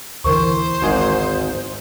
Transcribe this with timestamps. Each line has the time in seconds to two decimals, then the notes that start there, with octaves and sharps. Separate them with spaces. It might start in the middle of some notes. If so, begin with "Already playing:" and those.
0.24 D2 D3 E3 A#4 C5 C#6
0.82 G#1 G#2 G#4